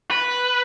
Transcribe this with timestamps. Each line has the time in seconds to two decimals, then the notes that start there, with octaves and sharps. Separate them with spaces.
0.11 B4